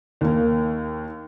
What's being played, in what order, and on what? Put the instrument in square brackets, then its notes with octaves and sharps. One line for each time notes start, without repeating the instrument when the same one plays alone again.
[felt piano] D#2 A#3